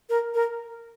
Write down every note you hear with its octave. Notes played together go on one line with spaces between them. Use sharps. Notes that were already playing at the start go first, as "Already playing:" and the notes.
A#4
A#4